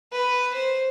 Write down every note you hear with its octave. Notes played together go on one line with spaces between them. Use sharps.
B4
C5